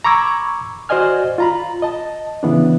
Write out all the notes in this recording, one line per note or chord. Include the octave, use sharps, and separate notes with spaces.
A#5 B5 C#6 D6 E6 G#6
F#4 C5 D5 D#5 G#5 F6
F4 A#5 B5
D#5 A5
C#3 E3 B3 D4